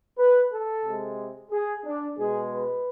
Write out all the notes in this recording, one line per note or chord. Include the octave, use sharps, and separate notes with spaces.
B4
A4
C3 G#3
G#4
D4
B2 G#3 G#4
B4